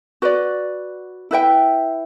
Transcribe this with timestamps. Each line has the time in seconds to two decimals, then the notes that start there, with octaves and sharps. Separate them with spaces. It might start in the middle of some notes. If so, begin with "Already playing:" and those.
0.22 F#4 B4 D5
1.31 E4 B4 E5 G5